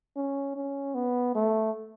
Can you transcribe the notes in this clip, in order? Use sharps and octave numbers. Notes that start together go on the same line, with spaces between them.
C#4
C#4
B3
A3